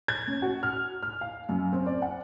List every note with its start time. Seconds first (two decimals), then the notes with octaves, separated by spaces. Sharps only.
0.08 G#6
0.28 C#4
0.42 F#4
0.63 F6
1.02 F6
1.21 F5
1.49 F#2
1.73 C4
1.86 D5
2.02 F#5